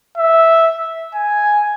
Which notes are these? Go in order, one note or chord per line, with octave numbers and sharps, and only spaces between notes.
E5
G#5